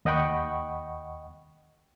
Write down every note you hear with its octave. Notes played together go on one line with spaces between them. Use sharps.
D#2 D#5 F#5 G5 B5 C#6